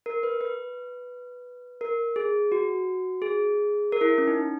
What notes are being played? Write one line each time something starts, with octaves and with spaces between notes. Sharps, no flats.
A#4
B4
B4
A#4
G#4
F#4
G#4
A#4
E4
C#4
D#4